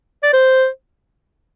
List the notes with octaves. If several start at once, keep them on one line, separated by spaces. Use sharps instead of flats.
D5
C5